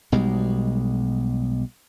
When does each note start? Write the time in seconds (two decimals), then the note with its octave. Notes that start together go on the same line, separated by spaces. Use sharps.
0.12 B1 B2 G3 G#3